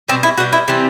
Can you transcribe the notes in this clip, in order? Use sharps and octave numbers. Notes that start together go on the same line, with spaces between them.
B2 G3 C4
E4
B2 G3 F#4
E4
C3 E3 G3 C4